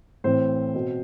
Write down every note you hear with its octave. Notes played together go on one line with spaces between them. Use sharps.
A2 E3 C4 C5
B2